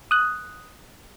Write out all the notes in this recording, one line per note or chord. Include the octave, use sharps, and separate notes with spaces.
D#6 F#6